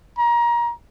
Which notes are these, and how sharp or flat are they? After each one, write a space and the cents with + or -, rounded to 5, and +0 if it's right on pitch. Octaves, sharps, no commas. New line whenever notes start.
A#5 +25